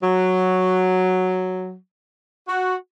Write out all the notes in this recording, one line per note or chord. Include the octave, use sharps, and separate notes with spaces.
F#3
F#4